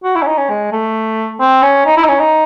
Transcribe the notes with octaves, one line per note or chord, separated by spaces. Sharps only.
F#4
E4
C#4
D#4
C#4
G#3
A3
C4
C#4
D#4
E4
D#4
C#4
D#4